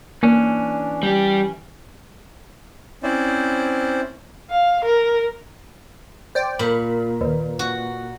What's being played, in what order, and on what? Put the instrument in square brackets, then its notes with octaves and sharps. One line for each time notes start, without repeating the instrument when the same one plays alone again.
[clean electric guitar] E3 C#4 [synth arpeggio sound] A#3 [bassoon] D4
[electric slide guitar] G3 G4
[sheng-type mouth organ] C4 C#4 E4 C5 D5
[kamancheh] F5
A#4
[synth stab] C5 D5 G5
[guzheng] A#2 [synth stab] B5
[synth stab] D#2 [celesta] B4 D5
[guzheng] F#4